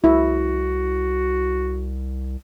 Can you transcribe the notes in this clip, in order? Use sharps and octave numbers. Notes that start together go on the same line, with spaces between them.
C2 E4 F#4